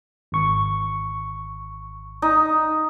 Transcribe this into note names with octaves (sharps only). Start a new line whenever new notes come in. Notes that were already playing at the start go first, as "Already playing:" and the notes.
G#1 C#6
D#4